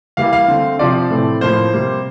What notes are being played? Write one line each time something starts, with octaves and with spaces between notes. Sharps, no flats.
E3 G3 A#3 F5
F5
D3 A3 C4
C3 F3 C4 D5
A2 E3 A3 C4
A2 F3 A#3 C5
C3 G3 A#3